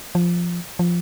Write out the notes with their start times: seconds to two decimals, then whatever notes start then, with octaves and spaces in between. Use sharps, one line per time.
0.15 F3
0.79 F3